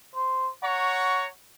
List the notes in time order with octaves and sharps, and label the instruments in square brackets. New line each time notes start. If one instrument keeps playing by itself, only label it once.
[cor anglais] C5
[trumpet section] C#5 A#5 C#6 [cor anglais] F#5